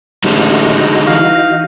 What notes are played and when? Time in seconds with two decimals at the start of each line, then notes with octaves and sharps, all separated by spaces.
0.24 A1 D3 G3 G#3 D#4 F#4
1.07 E3 F5